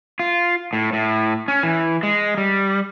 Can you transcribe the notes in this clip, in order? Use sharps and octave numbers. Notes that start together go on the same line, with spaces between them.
F4
A2
A2
C#4
E3
G#3
G3